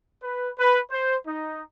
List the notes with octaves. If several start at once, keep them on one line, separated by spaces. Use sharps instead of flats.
B4
B4
C5
D#4